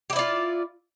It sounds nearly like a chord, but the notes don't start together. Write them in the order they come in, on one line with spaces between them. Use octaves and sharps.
G4 E4 D5 F4